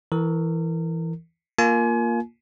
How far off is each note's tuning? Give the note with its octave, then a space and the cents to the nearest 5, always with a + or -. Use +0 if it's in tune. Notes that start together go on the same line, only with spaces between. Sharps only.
E3 +0 A#4 -30
A#3 +0 F4 +0 G#5 +30